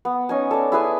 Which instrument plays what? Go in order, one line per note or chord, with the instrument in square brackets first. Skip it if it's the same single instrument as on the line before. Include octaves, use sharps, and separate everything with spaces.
[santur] B3
C#4 D#4 G#5
A4 D5
E4 G#4 B4 G#5